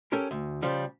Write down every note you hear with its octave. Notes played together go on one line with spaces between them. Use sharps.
C#4 G4 A4 A#4
D2
C#3 F3 G3 F5